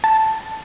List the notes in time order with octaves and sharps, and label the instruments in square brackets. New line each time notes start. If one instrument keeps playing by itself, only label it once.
[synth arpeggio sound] A5